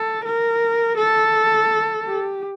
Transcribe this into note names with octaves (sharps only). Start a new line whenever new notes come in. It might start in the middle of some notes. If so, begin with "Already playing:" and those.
Already playing: A4
A#4
A4
G4